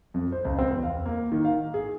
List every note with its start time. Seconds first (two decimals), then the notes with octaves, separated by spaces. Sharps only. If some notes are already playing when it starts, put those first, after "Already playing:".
0.14 F2
0.32 C5
0.45 C#2
0.59 C4
0.71 E2
0.83 F5
1.06 A#3
1.32 D#3
1.45 F5
1.74 G#4